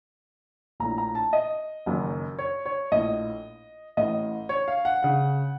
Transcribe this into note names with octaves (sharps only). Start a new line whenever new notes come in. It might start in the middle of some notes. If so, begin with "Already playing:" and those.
A#1 A2 A#5
A#5
A5
D#5
F#1 F#2 D#3
C#5
C#5
A#1 A2 D#5
A1 A2 D#5
C#5
F5
F#5
C#3 F#5